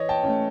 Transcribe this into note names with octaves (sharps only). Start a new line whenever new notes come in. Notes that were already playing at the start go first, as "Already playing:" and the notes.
Already playing: E3 C#5 D#5
G5 A5
A3 C#4